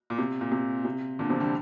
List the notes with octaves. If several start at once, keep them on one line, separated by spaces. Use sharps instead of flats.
A#2
C3
A#2
C3
C3
A#2 D3
C3 F3
D3 G3